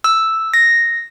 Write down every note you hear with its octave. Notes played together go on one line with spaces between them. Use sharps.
E6
A#6